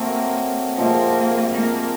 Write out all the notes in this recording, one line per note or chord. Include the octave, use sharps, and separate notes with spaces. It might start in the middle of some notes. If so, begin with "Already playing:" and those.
Already playing: F#3 A3 A#3 C4
C3 F3 G#3 A#3 C4
A#3